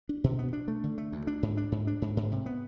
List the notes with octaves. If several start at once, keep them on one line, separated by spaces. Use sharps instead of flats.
D4
B2
B3
D4
A3
D3
A3
D2
D4
G#2
D4
G#2
D4
G#2
G#2
C3
B3